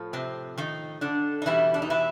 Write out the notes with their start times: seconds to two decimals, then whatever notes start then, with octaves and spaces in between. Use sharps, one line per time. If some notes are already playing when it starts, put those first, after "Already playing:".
Already playing: A2 F3
0.13 C3 C4
0.58 D#3 D#4
1.01 D3 D4
1.42 D#4
1.46 E2 B2 E3 G3 E4
1.74 D4
1.82 D#4
1.90 E3 E4